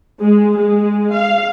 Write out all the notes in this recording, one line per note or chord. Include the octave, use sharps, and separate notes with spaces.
G#3
G#3
F5